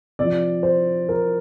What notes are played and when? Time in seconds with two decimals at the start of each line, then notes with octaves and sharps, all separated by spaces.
0.19 C3 F3 D5
0.63 C5
1.09 A#4